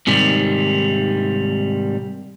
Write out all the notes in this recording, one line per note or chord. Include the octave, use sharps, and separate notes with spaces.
G#2 C3 D#3 G3